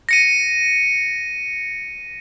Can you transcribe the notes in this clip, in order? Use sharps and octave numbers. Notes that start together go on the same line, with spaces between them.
A#6 C#7 D#7